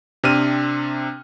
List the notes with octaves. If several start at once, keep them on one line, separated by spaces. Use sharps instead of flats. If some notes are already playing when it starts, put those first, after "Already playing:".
C3 C4 D4 F6 D#7